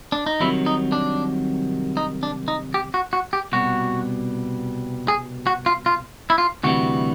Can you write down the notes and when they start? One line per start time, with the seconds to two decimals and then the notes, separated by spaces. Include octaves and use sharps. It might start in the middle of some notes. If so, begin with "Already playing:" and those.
0.12 D4
0.26 D#4
0.40 C2 C3 D#3 F#3 E4
0.66 D#4
0.92 D4
1.97 D#4
2.23 D4
2.48 D#4
2.74 G4
2.94 F#4
3.13 F#4
3.33 G4
3.52 C2 B2 G3 F#4
5.08 G#4
5.47 F#4
5.66 F4
5.86 F4
6.30 E4
6.38 F4
6.64 D2 C3 E3 G3 F#4